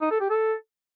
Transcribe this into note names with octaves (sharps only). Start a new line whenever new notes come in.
D#4
A4
G4
A4